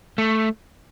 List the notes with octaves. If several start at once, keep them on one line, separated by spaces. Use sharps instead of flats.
A3